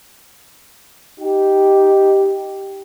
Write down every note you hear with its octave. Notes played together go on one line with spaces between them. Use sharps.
D#4 G4